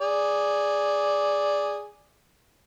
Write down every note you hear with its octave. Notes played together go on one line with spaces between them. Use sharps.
G#4 D5